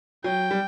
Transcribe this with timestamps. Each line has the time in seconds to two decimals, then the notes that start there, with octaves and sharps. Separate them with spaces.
0.24 F#3 G5
0.51 G3